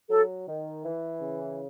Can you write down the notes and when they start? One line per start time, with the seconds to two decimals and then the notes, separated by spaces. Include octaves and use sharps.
0.10 F#3 A4
0.47 D#3
0.84 E3
1.20 C#3